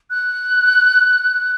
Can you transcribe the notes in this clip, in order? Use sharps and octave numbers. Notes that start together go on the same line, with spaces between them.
F#6